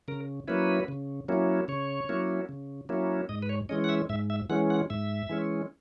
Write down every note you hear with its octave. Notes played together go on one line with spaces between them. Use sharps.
C#3 A#4
F#3 A#3 C#4 E4 B4
C#3
F#3 A#3 C#4 E4
C#3 C#5
F#3 A#3 C#4 E4
C#3
F#3 A#3 C#4 E4
G#2 D#5
B4
C#5
E3 G#3 C#4 D#5
F#5
E5
G#2 E5
E5
E3 G#3 C#4 F#5
F#5
G#2 E5
E3 G#3 C#4